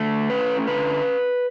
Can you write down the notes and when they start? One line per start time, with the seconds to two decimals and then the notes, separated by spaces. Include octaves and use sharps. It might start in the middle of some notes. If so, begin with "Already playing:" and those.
Already playing: D3 A3
0.30 C#4 B4
0.67 D3 B4